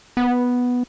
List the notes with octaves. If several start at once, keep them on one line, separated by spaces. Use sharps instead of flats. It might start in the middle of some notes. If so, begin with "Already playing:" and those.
B3